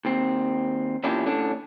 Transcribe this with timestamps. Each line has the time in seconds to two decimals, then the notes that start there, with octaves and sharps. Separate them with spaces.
0.05 D#2 C4
1.04 E2 A#2 C#4 D4 E4 G4
1.25 A2 D3 C#4 D4